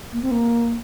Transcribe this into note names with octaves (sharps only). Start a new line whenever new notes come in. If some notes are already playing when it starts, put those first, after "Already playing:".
A#3
C4
A#3